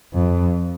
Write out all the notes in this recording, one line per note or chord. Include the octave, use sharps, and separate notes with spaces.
F2